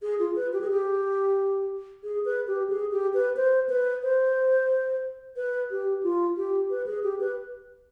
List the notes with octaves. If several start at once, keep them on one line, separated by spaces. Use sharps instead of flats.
G#4
F4
B4
G4
G#4
G4
G#4
B4
G4
G#4
G4
B4
C5
B4
C5
B4
G4
F4
G4
B4
G#4
G4
B4